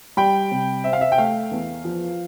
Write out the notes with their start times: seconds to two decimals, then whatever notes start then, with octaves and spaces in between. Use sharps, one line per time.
0.17 G3 G5 B5
0.51 C3
0.84 C4 E5
0.93 F5
1.01 E5
1.12 G5
1.18 A3 F5
1.51 E2
1.85 F3